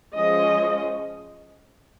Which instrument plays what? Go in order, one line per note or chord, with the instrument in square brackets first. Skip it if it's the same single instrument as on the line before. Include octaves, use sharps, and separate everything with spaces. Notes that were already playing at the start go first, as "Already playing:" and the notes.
[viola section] F3 G#3 C#4 D#5